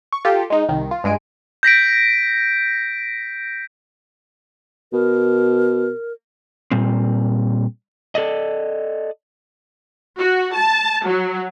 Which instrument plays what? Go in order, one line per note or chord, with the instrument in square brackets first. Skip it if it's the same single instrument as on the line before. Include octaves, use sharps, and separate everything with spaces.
[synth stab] C#6
F4 G4 A4
G#3 D#4
C2 D#3
F4
G2 G#3 G#5 D7
[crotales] G6 A#6 B6 D7
[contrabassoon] B2 [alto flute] A#4
[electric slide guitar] A#2 G3 C4
A4 D5 D#5
[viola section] F#4
A5
F#3